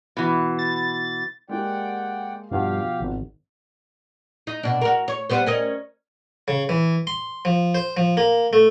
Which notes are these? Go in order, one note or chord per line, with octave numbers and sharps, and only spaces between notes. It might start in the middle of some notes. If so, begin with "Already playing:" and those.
B2 E3
A6
G#3 A#3 G4 D5 F#5 G5
G2 B2 F3 G4 F5 F#5
G#1
D#4
B2 D4
F#4 A#4
C#5
G3 B3 C5
C#4 A#4 D#5
C#3
E3
C6
F3
C5
F3
A#3
A3